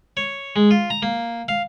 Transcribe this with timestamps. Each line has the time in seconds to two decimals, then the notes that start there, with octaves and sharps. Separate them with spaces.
0.17 C#5
0.56 G#3
0.71 F4
0.90 A#5
1.02 A#3
1.48 F5